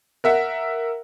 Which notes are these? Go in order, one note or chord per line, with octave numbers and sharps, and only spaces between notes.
A#4 E5 F#5